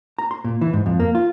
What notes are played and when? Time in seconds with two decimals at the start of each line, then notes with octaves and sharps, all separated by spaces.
0.19 A#5
0.31 C6
0.44 A#2
0.61 E3
0.73 G#2
0.86 F2
1.00 A#3
1.15 F4